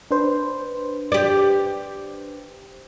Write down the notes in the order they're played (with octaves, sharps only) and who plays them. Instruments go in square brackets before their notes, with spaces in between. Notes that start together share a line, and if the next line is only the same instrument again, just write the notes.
[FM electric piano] D4 B4 C5
[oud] G4 D5